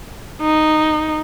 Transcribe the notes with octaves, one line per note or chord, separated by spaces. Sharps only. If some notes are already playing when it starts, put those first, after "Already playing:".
D#4